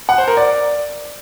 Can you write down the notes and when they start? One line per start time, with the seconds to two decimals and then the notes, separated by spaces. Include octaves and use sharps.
0.09 F#5
0.18 C5
0.28 A#4
0.37 D5